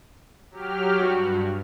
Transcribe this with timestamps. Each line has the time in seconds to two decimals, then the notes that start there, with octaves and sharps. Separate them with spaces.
0.51 F#3 G4 F6
1.01 G2 F#4